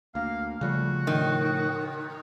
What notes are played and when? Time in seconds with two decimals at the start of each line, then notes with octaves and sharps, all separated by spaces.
0.15 D2 A#3 F5
0.61 C#3 F3 G3 A3 F#4
1.07 A2 D#3